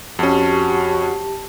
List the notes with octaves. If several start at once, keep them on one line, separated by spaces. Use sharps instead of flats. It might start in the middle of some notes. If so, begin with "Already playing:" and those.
F2 C#4 F#4 G4 A5